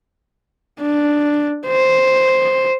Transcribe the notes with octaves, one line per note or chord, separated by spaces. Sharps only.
D4
C5